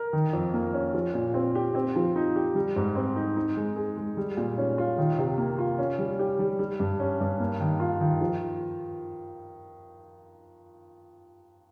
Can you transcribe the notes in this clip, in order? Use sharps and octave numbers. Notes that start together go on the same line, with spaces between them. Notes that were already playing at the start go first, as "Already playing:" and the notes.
Already playing: A#4
D#3
F2
A#3
C#4
F3
A#2
C4
G4
C4
F3
D#4
G4
G3
G#2
C4
D#4
D#4
G#3
G#4
G#3
G3
A#2
C#4
F4
D#3
C3
A#3
F4
C#4
G3
G4
G3
G3
G2
C#4
G2
A#3
D#3
F4
D#3
F3